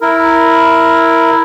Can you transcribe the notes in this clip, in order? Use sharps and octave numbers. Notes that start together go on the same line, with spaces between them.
E4 A#4